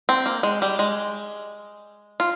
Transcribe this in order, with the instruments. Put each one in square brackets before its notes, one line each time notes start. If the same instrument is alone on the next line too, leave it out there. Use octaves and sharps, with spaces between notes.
[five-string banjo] C4
A#3
G#3
G3
G#3
F4